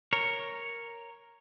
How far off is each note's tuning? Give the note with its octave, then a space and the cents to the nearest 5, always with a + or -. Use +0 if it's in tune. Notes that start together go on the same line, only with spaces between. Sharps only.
A#4 +0 C#5 +0